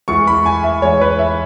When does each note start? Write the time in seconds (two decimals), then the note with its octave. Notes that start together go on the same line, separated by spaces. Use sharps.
0.08 E2 E3 G#3 C#6
0.27 B5
0.46 G#5
0.64 E5
0.82 E2 E3 G#3 C#5
1.01 B4
1.19 E5